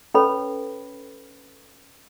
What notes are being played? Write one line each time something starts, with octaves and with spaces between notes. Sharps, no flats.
C#4 A4 B4 C#5 B5